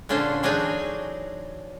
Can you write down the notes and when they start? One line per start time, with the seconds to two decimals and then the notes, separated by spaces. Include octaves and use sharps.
0.09 A#2 D3 C#4 D4 G#4 C5
0.43 E3 F#3 D4 D#4 F#4 G#4